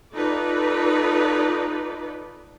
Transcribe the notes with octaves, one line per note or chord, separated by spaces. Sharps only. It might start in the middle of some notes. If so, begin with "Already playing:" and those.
D#4 F4 A4 B4 D5